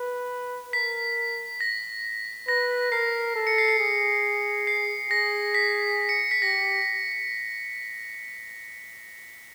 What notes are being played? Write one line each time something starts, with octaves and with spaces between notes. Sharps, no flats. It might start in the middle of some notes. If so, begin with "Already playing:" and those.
Already playing: B4
A#4 B6
A#6
B4 A#6
A#4 C7
A4
C#7
C7
C7
G#4
C7
G#4 A#6
B6
C#7
B6
G4 A#6